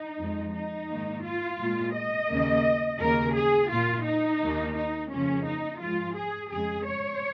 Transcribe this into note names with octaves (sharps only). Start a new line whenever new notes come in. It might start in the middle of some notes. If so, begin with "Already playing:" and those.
Already playing: D#4
F2 F3 G#3
D#4
G#2 D#3 A#3
F4
A#2 G#3
D#5
D#2 C#3 A#3
D#2 C#3 A#3 A#4
G#4
A#2 A#3 F4
D#4
D#2 D#3 A#3
D#4
F2 C#3 F3 A#3 C#4
D#4
G#2 F3 G#3 F4
G#4
F2 C#3 G#3 G#4
C#5